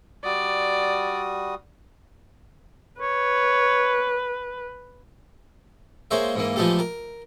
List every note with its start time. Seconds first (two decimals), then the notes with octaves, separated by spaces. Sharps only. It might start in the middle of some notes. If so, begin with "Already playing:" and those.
0.25 G3 F#4 D5 D#6
3.01 B4 C#5
6.11 G#3 A#3 C5 C#5 E5
6.35 G#2 E3 A#3
6.56 E3 F3 G#3 A3 G4 A4
6.79 A#4